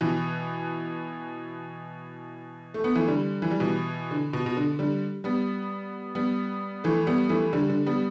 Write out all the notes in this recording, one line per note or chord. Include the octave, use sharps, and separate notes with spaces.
B2 E3
A3
B3
E3 A3
D3 G3
E3
G3
B2 E3
D3
B2
B2
D3
D3 G3
G3 B3
G3 B3
E3 A3
G3 B3
E3 A3
D3 G3
D3
G3 B3